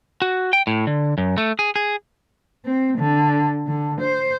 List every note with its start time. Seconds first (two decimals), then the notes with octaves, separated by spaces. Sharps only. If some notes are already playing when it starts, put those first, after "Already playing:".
0.22 F#4
0.53 G5
0.67 A2
0.87 D3
1.18 F#2
1.38 A3
1.59 G#4
1.76 G#4
2.65 C4
2.98 D3
3.67 D3
4.00 C5